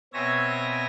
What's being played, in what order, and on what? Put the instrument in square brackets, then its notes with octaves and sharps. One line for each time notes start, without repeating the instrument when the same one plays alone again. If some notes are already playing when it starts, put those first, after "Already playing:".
[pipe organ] B2 C4 C#5 E5 G#5 A#6